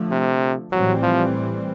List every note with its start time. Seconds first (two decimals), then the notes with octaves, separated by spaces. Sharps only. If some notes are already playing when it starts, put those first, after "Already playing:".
Already playing: D3 F3 A3
0.11 C3
0.72 A2 E3 F#3 G3 C4
1.02 F3